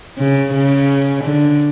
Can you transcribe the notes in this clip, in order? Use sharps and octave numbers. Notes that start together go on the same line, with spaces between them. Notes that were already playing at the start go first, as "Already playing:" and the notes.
C#3
C#3
D3